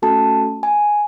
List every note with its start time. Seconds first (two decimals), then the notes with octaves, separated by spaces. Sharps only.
0.02 A3 C#4 F#4 A4 A5
0.63 G#5